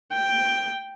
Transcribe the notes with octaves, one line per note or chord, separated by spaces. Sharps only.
G5